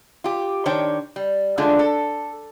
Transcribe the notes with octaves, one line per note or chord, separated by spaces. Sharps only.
F4 G4
D#3 D4 C5 C#5 G5
G3
D3 G#3 A3 D4 F4 G#4
A4